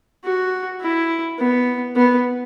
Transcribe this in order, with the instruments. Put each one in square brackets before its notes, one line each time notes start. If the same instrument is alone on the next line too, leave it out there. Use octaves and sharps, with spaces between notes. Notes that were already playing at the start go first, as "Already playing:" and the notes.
[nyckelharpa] F#4
E4
B3
B3